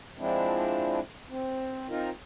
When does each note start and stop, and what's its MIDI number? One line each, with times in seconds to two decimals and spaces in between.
0.18 1.00 53
0.18 1.00 56
0.18 1.00 60
0.18 1.00 62
0.18 1.00 64
1.29 1.89 60
1.89 2.10 60
1.89 2.10 63
1.89 2.10 65
1.89 2.10 70